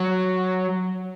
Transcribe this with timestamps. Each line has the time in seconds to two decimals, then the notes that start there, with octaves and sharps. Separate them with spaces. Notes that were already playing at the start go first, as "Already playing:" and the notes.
Already playing: F#3